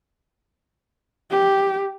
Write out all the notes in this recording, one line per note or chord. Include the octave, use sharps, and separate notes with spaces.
G4